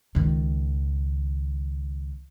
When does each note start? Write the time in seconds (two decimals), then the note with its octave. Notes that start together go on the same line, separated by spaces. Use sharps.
0.15 C#2 D#3